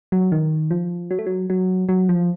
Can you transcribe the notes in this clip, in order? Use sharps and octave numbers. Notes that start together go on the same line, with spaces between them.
F#3
D#3
F3
F#3
A3
F#3
F#3
F#3
F3